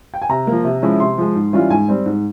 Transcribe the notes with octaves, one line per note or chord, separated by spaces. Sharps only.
G5
G#5
C3 A#5
F3 A#3
C3
F3 G#3 C#4 E4
C3 C6
F3 G#3
G#2
E3 G3 C#4 F4
G#2 G#5
G3 C4
G#2